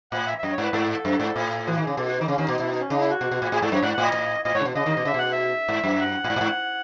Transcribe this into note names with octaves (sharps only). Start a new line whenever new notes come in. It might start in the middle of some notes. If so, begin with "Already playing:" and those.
A2 F#5
E5
E5
F#2 D#5
C#5
G#2 B4
G#2 A4
F#2
G#2
A2
E3 F#4
D#3
G#4
C#3
B2 A4
F#4
D#3 D#4
C#3 C#4
D#2 D#3
B2 D#4
B2 E4
D#4
C#4
C#3 D#4
E4
F#4
B2
B2
A2
A2 G#4
G#2 A4
F#2 C#5
G#2 F#5
A2 F#5
D#5
A2
A2 D#5
G#2 C#5
C#3
B2
C#3 D#5
D#2 D#3
B2
C#3 E5
B2 F#5
E5
G#2
F#2
F#5
A2
G#2
A2
G#2